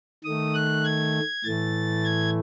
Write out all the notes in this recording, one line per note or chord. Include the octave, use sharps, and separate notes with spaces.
D#3 A3 D#6
F#6
G#6
A2 E3 A3 A6
G#6